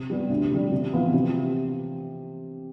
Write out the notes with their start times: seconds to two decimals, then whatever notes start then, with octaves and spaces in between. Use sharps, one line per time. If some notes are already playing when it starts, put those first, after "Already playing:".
Already playing: C3
0.10 G3 B3
0.30 D2
0.51 C3 G3
0.72 C3
0.93 E3 B3 F4
1.14 C3